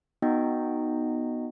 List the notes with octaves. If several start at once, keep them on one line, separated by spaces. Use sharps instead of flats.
B3 D#4 F#4 D#5 G5